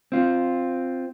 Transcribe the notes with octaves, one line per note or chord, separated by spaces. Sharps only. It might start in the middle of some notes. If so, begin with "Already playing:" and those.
C4 F4